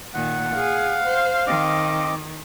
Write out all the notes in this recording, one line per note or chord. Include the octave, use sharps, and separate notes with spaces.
A#2 D#3 F#5
G#4 F5
C5
D#3 C4 D#5 D6